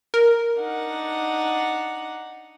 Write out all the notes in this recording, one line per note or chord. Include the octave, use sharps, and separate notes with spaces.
A#4
D4 D#4 F#5